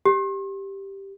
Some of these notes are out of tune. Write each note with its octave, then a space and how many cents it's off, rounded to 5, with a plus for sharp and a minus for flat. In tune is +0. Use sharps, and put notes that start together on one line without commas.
G4 +0